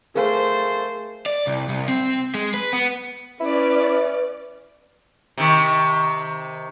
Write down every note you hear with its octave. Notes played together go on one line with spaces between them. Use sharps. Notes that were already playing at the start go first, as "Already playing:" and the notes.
A3 G#4 A#4 C5 F5 G#5
D5
C2
C2
C4
G#3
B4
B3
C#4 E4 B4 D5
C3 D#3